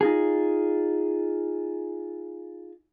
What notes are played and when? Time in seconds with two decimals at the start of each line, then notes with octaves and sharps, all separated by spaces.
0.01 D#4 F4 G#4